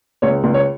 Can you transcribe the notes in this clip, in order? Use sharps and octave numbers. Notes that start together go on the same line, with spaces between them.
C#2 C#5
C#2
C#5